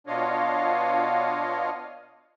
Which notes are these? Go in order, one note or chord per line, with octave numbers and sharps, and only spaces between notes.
B2 D4 F4 C#5 D#5 F5